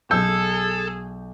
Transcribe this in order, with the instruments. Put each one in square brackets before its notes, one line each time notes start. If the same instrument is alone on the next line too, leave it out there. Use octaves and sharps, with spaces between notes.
[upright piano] B1 G6 [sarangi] G#4 [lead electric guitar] A4 [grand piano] E6